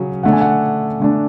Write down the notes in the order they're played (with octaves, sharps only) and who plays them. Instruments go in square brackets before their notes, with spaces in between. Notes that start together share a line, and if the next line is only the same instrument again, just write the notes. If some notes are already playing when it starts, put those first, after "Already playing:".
Already playing: [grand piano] C#3 F#3 C#4
D3 A3 D4 F#5
G#5
F#5
D3 A3 D4